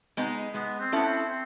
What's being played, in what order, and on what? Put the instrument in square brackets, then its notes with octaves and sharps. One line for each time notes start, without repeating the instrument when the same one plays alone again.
[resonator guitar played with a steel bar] G#3 B3 D#4 G#4
[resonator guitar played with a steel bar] G#3 [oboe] B3
[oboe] C4
[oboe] B3 [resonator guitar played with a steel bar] C#4 E4 A4
[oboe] C4
C4